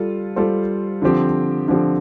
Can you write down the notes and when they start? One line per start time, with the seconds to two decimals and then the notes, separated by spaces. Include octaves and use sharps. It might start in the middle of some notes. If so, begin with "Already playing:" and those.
Already playing: G3 F4 A4
0.36 G3 F4 A4 C5
1.02 D3 F3 C4 G4
1.68 D3 F3 C4 G4